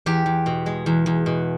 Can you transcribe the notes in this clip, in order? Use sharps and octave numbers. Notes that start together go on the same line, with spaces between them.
E2 G4
E2
B2
G#3
E2
E2
B2